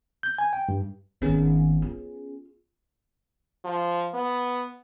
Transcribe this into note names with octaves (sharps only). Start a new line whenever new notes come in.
G6
G#5
G5
G2
G#1 D#3 B3 C#4 G#4
F4
F3
B3